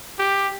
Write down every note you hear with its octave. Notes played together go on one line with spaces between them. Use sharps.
G4